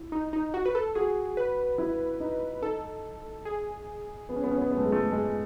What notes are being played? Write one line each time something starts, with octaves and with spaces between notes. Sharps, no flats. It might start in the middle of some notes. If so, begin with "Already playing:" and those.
Already playing: E4
D#4
D#4
F#4
B4
A4
F#4 G#4
B4
E4
D#4
D#4 A4
G#4
B3
C#4
B3
C#4
B3
B3
A3
G#3
A3
G#3